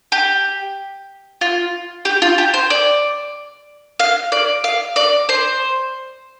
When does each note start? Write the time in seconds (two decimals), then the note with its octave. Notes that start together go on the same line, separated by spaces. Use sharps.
0.12 G4
1.41 F4
2.05 G4
2.22 F4
2.38 G4
2.54 C5
2.70 D5
3.99 F5
4.32 D5
4.64 F5
4.96 D5
5.29 C5